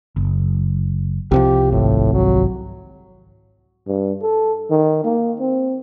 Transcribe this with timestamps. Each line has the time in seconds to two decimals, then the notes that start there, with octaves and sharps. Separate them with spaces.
0.16 F#1
1.31 C2 C3 F3 G4
1.72 G#1 A2
2.14 F#3
3.87 G2
4.23 A4
4.71 D#3
5.04 A#3
5.40 C4